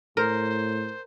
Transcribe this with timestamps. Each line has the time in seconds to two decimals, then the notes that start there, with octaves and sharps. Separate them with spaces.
0.17 A2 A#4 C5